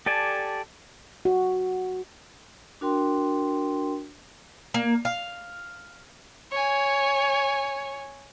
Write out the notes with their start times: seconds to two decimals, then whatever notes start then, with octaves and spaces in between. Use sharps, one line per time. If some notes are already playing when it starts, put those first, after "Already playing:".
0.06 G4 A4 D5 G#5 A5
1.25 F#4
2.81 D4 F#4 A#4 G5 C6
4.74 A#3
5.05 F5
6.51 C#5 G#5